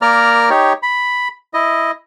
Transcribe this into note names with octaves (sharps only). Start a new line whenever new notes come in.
A#3 A#4 D5 A#5 F6
D#4 G4 C#5
B5
E4 D#5